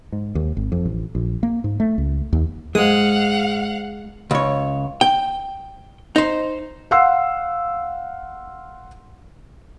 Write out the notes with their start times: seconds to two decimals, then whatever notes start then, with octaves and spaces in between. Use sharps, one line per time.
0.12 G#2
0.35 D#2
0.57 G#1
0.72 F2
0.85 A1
1.15 A#1
1.43 A#3
1.64 G#2
1.80 A3
1.98 C#2
2.33 D#2
2.75 G#2 G#3 F5 F#5 D#6
4.31 C#2 C#5
5.01 G5
6.16 D#4 C5
6.91 F5 F#5 C6 E6 C7